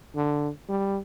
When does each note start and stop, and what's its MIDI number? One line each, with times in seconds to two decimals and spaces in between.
0.16 0.49 50
0.69 0.99 55